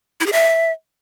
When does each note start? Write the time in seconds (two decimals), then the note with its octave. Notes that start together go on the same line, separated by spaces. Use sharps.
0.20 E4
0.26 G#4
0.32 E5